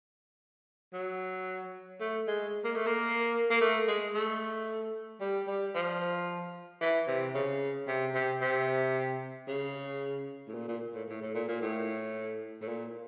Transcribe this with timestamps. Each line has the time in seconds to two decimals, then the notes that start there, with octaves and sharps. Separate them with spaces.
0.93 F#3
2.00 A3
2.27 G#3
2.64 A#3
2.75 A3
2.87 A#3
3.50 A#3
3.61 A3
3.88 G#3
4.14 A3
5.20 G3
5.47 G3
5.74 F3
6.81 E3
7.07 C3
7.34 C#3
7.87 C3
8.14 C3
8.41 C3
9.48 C#3
10.48 A2
10.54 A#2
10.68 A#2
10.94 A2
11.09 A2
11.21 A2
11.34 A#2
11.48 A#2
11.61 A2
12.61 A2
12.68 A#2